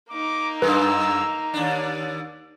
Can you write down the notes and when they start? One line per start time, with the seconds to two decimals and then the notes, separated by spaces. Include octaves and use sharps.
0.10 A#3 D#4 D6
0.62 F#2 G#3 B4 E6
1.54 D#2 D4 D5